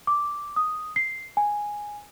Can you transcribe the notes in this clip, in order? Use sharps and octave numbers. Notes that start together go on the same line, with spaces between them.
D6
D#6
C7
G#5